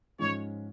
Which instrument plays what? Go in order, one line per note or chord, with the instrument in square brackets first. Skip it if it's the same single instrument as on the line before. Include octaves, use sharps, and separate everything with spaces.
[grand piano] G#2 F3 G#3 C#4 F4 [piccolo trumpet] C#5